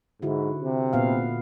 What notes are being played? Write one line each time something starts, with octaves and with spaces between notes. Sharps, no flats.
G#2 D3 E4 F#4
C3
A#2 B3 F5